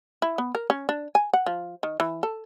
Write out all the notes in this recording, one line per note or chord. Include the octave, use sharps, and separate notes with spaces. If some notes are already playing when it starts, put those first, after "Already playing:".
E4
B3
A#4
C#4
D4
G#5
F#5
F3
D#3
E3
A4